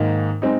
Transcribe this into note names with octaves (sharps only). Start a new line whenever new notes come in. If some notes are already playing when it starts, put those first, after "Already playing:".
Already playing: G#2 D#3 A#3 D#4
G#3 C4 D#4